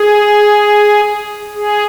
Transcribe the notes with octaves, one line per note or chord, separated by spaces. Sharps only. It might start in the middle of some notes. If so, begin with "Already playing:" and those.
Already playing: G#4
G#4